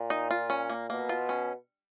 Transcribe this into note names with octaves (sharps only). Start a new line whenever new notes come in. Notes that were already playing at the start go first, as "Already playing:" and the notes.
Already playing: A#2
D#4
F4
C#4
A#3
B2 A#3
F4
C#4